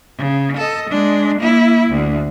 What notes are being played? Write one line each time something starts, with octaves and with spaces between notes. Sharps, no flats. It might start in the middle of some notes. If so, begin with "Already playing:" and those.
C#3
A4 D#5
G#3 D4
A#3 E4
D2